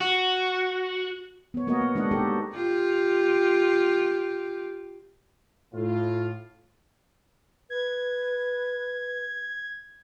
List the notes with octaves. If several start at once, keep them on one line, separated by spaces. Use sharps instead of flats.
F#4
B3 C#5
A#3 B3 F#4 A#4 C#5 D#5
B3
G#3 D4 F#4 D#5 F#5
D#4 G4 A4
F4 G4
A2 F4
B4 G#6